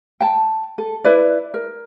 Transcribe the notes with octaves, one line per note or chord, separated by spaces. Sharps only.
G5 A5
A4
E4 B4 D5
A#4